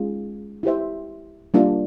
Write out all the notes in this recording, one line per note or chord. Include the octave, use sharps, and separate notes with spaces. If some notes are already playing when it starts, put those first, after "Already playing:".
Already playing: G#3 C#4 F4 G#4
E4 G4 C5 E5
G3 A#3 D4 F4